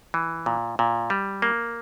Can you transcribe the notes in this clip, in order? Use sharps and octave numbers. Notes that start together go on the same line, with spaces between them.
E3
A#2
A#2
G3
A#3